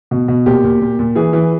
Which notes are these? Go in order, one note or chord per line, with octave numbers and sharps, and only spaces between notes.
B2
B2
A#2 G4
A#2
A#2
A#2
E3 G#4
E3